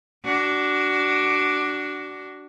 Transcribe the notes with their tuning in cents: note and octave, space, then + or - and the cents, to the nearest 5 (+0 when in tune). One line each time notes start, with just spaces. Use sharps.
D4 +0 F#4 +25